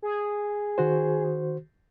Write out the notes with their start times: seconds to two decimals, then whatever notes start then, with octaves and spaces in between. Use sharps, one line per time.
0.02 G#4
0.78 D#3 F#4 C5